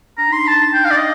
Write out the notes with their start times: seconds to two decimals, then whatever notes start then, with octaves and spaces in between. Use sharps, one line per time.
0.18 D4 A#5
0.28 D#4 C6
0.37 D4
0.48 A5
0.74 G5
0.85 F5
0.91 D5
0.96 D#5